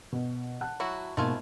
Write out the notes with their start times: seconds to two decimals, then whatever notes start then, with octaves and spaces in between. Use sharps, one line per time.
0.12 B2
0.61 F#5 A5 F#6
0.80 F#3 E4 F#4
1.17 G#2 B2 A3 A#3 F4 G#5